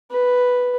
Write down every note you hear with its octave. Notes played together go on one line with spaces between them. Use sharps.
B4